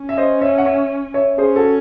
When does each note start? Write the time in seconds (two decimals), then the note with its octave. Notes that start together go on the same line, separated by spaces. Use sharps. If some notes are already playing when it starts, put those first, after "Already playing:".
Already playing: C#4
0.09 E5
0.17 C5 D#5
0.41 C#5 E5
0.58 F#5
0.65 C#5 E5
1.14 C#5 E5
1.38 C#4 G#4 C5
1.56 F#4 A4